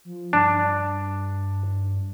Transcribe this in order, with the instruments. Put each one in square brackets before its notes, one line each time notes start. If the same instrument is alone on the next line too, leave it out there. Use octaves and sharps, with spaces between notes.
[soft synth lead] F3
[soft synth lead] G2 [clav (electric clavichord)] D4